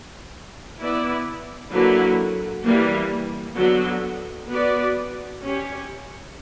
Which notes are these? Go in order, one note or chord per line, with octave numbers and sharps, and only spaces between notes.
B3 E4 B4 D5
D3 F#3 A#3 E4 B4
E3 G3 A#3
D3 F#3 B3 F#4
B3 F#4 B4 D5
C#4 G4 C#5